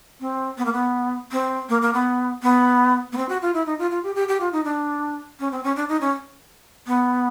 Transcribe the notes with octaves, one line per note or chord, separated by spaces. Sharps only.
C4
B3
A#3
B3
C4
A#3
A#3
B3
B3
B3
C4
F#4
F4
E4
D#4
F4
F4
G4
G4
G4
F4
D#4
D4
C#4
C4
C#4
D4
D#4
C#4
B3